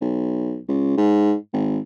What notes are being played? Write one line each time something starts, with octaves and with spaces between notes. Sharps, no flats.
B1
C#2
G#2
G#1